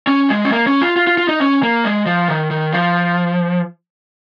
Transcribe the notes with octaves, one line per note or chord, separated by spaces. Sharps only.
C#4
G#3
C#4
A#3
C#4
F4
F4
F4
F4
D#4
C#4
A#3
G#3
F3
D#3
D#3
F3